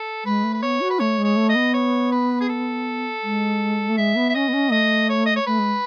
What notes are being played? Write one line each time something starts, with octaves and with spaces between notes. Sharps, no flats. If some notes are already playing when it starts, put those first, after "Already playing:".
Already playing: A4
G#3 B4
A3
B4
B3 C#5
F#4
B4
A3 C#5
G#3
C#5
A3
D#5
B3
C#5
B4
G#4
A4
G#3
A3
G#3 E5
B3
E5
C#4 D#5
B3
C#4
A3 D#5
C#5
D#5
C#5
A3 B4
G#3